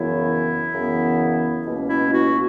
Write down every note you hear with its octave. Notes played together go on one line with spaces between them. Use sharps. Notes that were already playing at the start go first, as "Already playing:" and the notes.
Already playing: F#2 C#3 E3 B3 E4
F#2 C#3 E3 B3
C#2 B2 A#3 C#4
E4
F#4